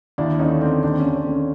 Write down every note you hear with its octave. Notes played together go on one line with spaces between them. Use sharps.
D#2 D4 E4
D3 C#4 D#4
A3 C4 D4
D#2 C4 D4
C#4
D#2
C4
A3
C#4